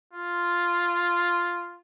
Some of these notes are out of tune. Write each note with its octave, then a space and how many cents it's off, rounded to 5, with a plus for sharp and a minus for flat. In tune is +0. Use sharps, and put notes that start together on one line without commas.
F4 +0